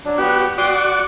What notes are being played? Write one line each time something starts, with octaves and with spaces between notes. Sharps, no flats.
F#3 D4
B3 F#4 G4
F#4 D5 G5 C6 D#6
C#6